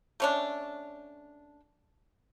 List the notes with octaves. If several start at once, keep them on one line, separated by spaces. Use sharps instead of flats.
A3 C#4 D4